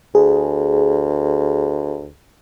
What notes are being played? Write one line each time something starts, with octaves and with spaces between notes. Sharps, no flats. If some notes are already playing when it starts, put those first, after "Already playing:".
D2 G#4